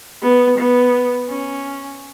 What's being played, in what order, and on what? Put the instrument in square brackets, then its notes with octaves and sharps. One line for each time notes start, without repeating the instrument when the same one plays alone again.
[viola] B3
B3
C#4